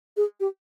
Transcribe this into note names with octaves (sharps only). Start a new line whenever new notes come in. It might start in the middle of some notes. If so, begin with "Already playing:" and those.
G#4
G4